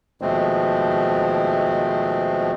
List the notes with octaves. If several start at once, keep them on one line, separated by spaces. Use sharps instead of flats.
D#2 B2 F3 G#3 A3 C4